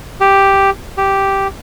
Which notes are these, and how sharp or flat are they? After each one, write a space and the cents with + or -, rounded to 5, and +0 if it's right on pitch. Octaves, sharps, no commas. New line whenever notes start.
G4 +0
G4 -5